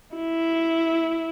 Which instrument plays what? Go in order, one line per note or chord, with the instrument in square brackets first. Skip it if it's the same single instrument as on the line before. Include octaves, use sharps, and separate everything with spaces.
[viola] E4